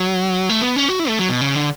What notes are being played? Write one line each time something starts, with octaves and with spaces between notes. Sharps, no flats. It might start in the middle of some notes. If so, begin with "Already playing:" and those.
Already playing: F#3
A3
B3
C#4
F#4
E4
A3
F#3
B2
C#3
D3